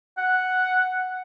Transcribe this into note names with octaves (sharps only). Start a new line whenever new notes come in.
F#5